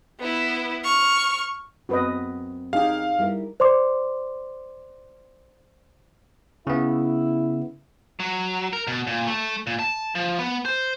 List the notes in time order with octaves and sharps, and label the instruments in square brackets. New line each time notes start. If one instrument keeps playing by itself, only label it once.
[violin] B3 E4
C#6 F6
[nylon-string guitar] F#2 B3 C4 [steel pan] F#4 B4 D#5
[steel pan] D#4 G4 G#4 [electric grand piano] F5
[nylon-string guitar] G3 E4 A#4
[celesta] C5 D5 C6 D6
[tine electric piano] C#3 B3 [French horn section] E4
[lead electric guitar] F#3
A#4
B2
A#2
A3
A#2
A5
F3
B3
C5